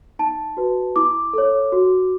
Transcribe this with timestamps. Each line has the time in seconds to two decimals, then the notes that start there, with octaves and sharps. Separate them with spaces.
0.19 D#4 A5
0.57 F#4 B4
0.96 E4 D6
1.33 A4 C#5
1.72 F#4